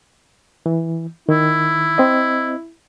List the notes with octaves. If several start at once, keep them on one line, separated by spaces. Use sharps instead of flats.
E3
D#3 E4
C4 D#5